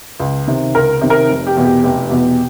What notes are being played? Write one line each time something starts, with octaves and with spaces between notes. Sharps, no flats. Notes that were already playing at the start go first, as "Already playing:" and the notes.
C#2
C3 D#3
C#2 A#4
C3 D#3
A#4
F1
G4
E2 B2
G4
F1 G4
E2 B2